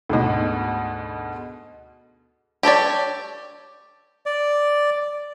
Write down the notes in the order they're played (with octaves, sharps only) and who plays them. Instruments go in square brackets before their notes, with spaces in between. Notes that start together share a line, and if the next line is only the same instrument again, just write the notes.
[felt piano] D2 G#2 B2
[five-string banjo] G4 A4 C#5 D5
[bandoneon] D5